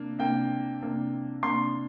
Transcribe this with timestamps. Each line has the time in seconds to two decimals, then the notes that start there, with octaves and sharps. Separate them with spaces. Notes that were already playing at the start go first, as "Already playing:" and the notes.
Already playing: C3 A#3 D4
0.19 C3 A#3 D4 G5
0.81 C3 A#3 D4
1.43 C3 A#3 D4 C6